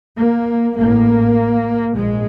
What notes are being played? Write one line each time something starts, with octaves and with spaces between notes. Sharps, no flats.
A#3
A1 A2 A#3
A#1 G#2 G#3